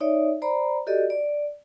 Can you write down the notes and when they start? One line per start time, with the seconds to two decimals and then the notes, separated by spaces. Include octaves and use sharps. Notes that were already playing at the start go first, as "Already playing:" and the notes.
0.01 D#4 C#5 D5 E5
0.42 C5 D5 A#5 B5
0.87 F#4 G4 A4 D5 D#5
1.10 D5